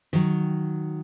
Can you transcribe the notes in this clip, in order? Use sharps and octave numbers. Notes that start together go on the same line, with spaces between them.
D#3 F#3